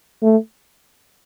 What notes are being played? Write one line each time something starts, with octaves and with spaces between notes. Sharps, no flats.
A3